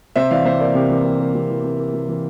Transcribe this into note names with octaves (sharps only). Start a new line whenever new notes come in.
C3 C5 E5
E3 D5 F5
C3 C5 E5
A#3 A#4 D5
C3 G4 A#4
E3
C3
A#3
C3
E3
C3
A#3
C3
E3